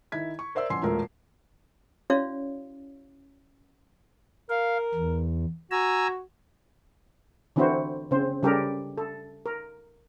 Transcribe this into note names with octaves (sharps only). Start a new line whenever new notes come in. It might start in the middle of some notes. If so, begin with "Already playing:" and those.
D#3 E4 G#6 B6
C#6
A#4 C5 D5 E5 E6
A1 F3 F4 G#5 C6 C7
E1 A#2 A3 A#4
C#4 E4 F#4 C#5 D5 F5
A#4 F5
E2
F#4 G#5 A#5 E6
D3 E3 C4 E4 F#4 C5
C#3 C4 C5
C#3 G3 G4 A4 A#4
A4
A#4